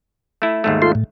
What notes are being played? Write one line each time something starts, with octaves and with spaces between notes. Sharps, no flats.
A3 E4
D#2 G#2 A3
F4 A4 C6
A2